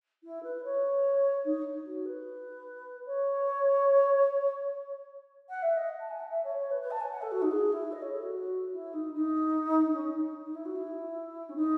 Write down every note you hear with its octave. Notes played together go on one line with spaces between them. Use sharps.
E4
B4
C#5
D#4
F#4
B4
C#5
F#5
E5
D#5
A5
G#5
F#5
E5
C#5
C#5
B4
B4
A5
G#5
F#5
A4
F#4
D#4
G#4
E4
D#5
C#5
A4
F#4
E4
D#4
D#4
C#4
D#4
D#4
E4
F#4
E4
C#4
D#4